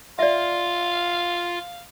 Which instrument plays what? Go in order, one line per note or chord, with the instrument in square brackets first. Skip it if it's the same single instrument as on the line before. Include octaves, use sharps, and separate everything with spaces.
[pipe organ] F4 [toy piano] D5 E5 [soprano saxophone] F5